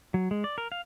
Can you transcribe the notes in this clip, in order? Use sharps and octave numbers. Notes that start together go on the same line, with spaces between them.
F#3
G#3
D5
A#4
F5